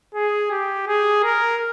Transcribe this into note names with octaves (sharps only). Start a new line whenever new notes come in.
G#4
G4
G#4
A#4